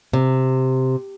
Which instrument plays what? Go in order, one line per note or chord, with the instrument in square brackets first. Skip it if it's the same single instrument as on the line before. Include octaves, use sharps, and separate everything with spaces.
[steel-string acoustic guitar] C3